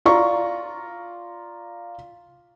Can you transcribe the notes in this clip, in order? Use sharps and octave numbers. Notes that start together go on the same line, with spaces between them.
F4 D5 A#5 C#6